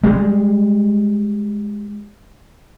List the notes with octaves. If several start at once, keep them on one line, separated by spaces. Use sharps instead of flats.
G3 G#3